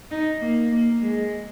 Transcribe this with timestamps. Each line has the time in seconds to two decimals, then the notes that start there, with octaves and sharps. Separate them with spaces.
0.11 D#4
0.41 A#3
0.72 A#3
1.01 G#3